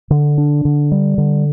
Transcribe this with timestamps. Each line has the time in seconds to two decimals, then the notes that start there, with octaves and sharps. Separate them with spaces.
0.10 D3
0.38 D4
0.65 D3
0.92 G3
1.18 D3